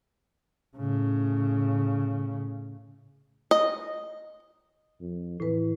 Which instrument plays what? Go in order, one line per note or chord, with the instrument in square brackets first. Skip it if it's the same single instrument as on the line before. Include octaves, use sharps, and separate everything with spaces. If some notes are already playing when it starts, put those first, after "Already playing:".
[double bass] A2 C#3
[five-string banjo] D#5
[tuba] F2
[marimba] A2 B4 [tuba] E3